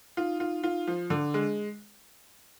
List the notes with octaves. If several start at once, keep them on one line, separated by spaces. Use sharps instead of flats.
D#4 F4
F4
F4
F3
D3 D4
G#3